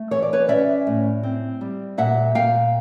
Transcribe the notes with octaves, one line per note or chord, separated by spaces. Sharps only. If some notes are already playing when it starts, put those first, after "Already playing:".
Already playing: A3
E3 C#5
D5
B4 C#5
C#4 D5 E5
A2
C4
G3
A#2 E5 F#5
A#2 F5 G5